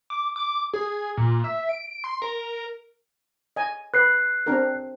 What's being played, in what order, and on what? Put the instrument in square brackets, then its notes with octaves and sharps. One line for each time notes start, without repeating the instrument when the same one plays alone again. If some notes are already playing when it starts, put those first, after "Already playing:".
[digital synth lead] D6
D6
G#4
A#2
E5
D7
C6
A#4
[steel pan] D#5 G#5
[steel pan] B4 [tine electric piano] F#6 C7
[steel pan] C4 D4 A#4